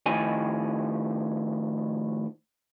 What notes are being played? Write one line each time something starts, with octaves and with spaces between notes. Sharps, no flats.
A2 D#3 F3 D#5 G#5